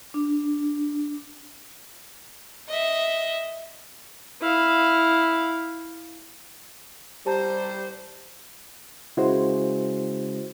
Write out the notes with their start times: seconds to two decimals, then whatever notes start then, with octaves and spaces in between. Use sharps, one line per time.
0.14 D4
2.68 D#5 E5
4.41 E4 F5
7.26 G3 G4 C5 A5 A#5
9.17 C#3 G#3 E4 F#4 C5